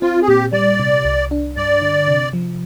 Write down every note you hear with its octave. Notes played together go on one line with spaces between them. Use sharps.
C4 F4
G#4
A#2 G4
G3 D5
C3
C2
D4
G2 D5
D3
C3
F3